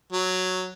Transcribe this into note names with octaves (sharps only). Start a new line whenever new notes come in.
F#3